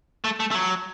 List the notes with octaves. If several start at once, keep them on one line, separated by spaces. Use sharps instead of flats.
A3
A3
A3
F#3